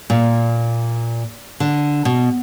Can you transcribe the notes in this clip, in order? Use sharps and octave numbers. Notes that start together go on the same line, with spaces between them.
A#2
D3
B2